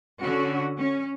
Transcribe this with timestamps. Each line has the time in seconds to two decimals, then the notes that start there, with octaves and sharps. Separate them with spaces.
0.20 D3 C#4 F#4
0.78 C#4